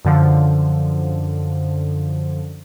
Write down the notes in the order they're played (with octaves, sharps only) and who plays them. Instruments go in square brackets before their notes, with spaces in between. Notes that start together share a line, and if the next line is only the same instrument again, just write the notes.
[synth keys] F#2 D3 F3